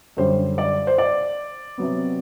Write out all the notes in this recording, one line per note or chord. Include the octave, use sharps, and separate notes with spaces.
F#2 D3 G3 C5
D5
C5
D5
C3 F#3 B3